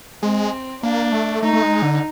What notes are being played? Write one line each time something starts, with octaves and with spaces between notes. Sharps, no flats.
G#3 C4
A#3 D4
A3
A3 D#4
A3
G#3
D3